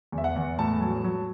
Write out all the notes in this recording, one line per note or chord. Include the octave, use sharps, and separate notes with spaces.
E2
E5
F#5
E2
A2 A5
F#3
F#3